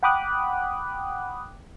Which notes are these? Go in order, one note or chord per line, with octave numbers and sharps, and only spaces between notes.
F#5 G5 B5 D6 D#6 F#6